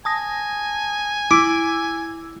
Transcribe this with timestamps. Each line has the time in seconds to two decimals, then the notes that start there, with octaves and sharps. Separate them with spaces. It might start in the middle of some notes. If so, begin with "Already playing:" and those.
0.05 G#5 A5 D#6 A#6
1.31 E4 D6 E6